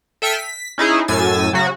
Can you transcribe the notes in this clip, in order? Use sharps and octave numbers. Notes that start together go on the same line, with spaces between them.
A4 E5 G5 F6 B6 D#7
B6
C#4 D#4 E4 G#4
F#2 A2 G#5 E6 A6
C#3 F#3 F#4